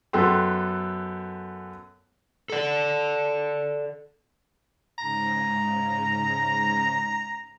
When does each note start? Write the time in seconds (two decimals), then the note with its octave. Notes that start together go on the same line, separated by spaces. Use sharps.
0.13 F#2 B3 A4 G5 C6
2.50 A4 D5
4.98 G#2 C#3 A#5